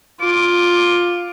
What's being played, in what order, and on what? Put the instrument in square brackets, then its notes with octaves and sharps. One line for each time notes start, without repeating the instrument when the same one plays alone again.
[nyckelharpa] F4 [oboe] D6